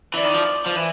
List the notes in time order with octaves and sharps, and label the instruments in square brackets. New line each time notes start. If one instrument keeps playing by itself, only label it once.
[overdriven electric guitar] E3 [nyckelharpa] D5
[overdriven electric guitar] D#3
F3
F3
E3